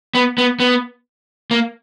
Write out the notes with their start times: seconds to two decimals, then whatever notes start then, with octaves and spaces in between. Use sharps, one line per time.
0.15 B3
0.38 B3
0.60 B3
1.51 A#3